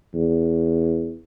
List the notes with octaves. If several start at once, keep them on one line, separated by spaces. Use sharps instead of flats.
E2